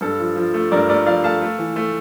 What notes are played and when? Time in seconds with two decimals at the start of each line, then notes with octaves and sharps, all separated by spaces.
0.01 G2 A4
0.20 F3
0.36 F3
0.54 A3
0.71 G2 A#4 D5
0.89 A3 A#4 D5
1.06 F3 D5 F5
1.24 A3 F5 A5
1.42 A3
1.59 E3
1.76 A3